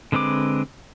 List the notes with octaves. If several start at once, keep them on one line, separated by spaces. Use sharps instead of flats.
D3 G#3 C4 B4 D6